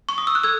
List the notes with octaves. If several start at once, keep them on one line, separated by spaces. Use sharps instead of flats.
C#6
D#6
E6
F#6
A4 E6 G#6